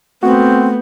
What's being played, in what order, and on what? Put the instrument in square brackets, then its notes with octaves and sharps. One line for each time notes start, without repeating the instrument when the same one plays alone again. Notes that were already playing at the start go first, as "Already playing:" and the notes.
[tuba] A3 [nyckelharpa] B3 [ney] C4 [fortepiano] F#4